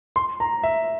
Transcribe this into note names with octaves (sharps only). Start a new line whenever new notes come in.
C6
A#5
E5